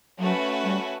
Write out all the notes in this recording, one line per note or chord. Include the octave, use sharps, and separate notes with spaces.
F#3 A3 C#4 F#4 B4
G3